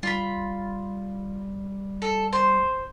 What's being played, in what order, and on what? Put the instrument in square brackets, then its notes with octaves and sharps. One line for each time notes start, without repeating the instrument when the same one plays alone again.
[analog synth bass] G3 [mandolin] F4 B5
[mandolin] A4
C5